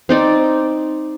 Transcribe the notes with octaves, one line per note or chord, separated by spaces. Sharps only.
C4 D#4 D5